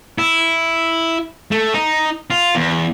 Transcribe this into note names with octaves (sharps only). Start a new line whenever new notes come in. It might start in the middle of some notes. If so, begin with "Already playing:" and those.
E4
A3
D#4
F4
E2